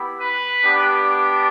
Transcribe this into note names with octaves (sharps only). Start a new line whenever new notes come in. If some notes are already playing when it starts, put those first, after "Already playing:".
Already playing: B3 E4 G4
B4
B3 D4 G4